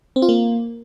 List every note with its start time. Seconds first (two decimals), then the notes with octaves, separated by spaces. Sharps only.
0.16 C4
0.22 F4
0.29 A#3